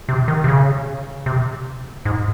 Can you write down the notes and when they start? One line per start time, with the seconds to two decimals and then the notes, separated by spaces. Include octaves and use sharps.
0.09 C3
0.28 D#3
0.44 C3
0.48 C#3
1.26 C3
2.05 G#2